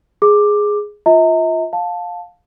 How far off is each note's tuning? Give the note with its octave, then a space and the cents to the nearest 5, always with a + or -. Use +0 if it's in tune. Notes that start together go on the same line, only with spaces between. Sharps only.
G#4 +0 D6 +10
F4 +5 E5 -45 A#5 -35
F5 +20 A5 +0